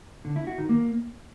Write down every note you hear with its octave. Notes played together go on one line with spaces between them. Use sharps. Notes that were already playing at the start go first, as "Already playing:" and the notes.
D3
E4
F#4
D#3
A#3